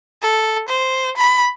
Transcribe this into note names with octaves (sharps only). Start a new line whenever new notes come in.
A4
C5
B5